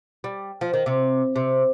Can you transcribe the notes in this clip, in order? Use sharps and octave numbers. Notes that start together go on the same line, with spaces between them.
G3
F3
D#3
C3
C3